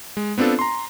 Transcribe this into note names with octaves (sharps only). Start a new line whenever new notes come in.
G#3
B3 C4 D4 F4 A4
A#5 C6